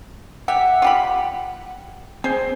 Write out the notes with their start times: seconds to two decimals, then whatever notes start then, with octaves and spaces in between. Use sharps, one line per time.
0.48 G4 E5 F#5
0.82 F4 G4 B5
2.24 C4 G#4 C5